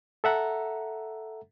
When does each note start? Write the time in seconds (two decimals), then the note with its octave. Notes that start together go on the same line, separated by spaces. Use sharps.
0.24 A4 E5 F#5 A#5